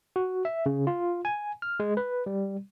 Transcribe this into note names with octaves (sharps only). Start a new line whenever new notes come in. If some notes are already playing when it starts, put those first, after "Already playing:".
F#4
E5
C#3
F4
G#5
F6
G#3
B4
G3